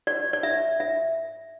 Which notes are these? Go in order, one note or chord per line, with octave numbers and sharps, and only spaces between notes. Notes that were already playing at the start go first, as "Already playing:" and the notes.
D5
D5
E5
E5